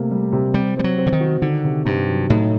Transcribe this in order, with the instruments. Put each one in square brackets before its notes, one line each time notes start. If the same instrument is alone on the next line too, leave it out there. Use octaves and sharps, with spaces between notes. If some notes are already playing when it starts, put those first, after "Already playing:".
Already playing: [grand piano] C3 A#3 [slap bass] A3
[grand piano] G3
C3
[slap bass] G3 [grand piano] C4
[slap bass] G3 [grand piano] C4
[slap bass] F#3
[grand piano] C4
[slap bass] D3
D#3
[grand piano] F#4
[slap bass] D3 [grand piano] D#3
[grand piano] C3
[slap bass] G2 [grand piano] C3
[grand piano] F#3
[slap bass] A2 [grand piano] D#4